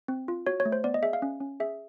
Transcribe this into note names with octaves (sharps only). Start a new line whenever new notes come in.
C4
F4
F#4 C#5
C#5
A3
C5
B3 D5
D#5
G#4 E5
F5
C#4
C#4
G#4 E5